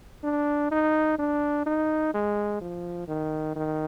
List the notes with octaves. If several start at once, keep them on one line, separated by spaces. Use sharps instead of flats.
D4
D#4
D4
D#4
G#3
F3
D#3
D#3